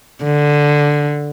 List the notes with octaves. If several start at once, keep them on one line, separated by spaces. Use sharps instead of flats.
D3